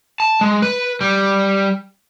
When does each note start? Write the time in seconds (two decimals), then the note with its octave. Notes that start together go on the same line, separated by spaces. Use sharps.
0.20 A5
0.41 G#3
0.62 B4
1.01 G3